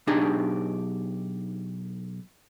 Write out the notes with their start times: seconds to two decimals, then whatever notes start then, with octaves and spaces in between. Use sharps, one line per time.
0.07 B1 D4 D#4 G4 G#4 A#5